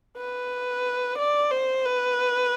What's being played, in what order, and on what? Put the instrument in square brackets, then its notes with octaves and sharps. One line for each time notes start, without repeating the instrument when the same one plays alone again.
[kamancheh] B4
D5
C5
B4